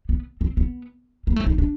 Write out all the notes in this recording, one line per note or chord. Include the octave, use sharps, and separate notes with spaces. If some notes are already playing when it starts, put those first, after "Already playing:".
B3
C4
B3
A#3
A3
D#4
D4